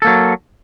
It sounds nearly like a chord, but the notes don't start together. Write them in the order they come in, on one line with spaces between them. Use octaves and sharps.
A4 A#3 F#3